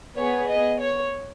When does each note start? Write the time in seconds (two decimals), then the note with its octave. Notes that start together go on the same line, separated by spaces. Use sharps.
0.15 B3 G#4 C#5
0.48 D#5
0.80 C#5